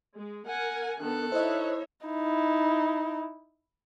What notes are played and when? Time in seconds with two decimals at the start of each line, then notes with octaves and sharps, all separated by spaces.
0.15 G#3
0.47 A#4 F#5 G#5
0.99 D#3 B3 D4 A4 F#6
1.32 D#4 E4 C5 C#5 D#5 E5
2.06 D#4 E4